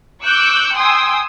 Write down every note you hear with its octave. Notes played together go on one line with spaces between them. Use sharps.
C#6 D6 E6 F#6 G6
G5 G#5 C6 D#6 E6